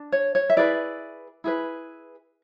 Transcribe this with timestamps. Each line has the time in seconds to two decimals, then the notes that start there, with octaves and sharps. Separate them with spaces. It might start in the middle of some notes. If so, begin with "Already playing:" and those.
Already playing: D4
0.12 C#5
0.35 C#5
0.50 E5
0.57 E4 G#4 B4 D5
1.44 E4 G#4 B4